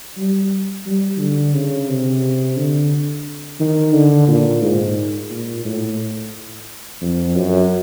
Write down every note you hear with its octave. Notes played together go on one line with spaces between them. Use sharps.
G3
G3
D3
C#3
C3
D3
D#3
D3
A#2
G#2
A#2
A2
F2
F#2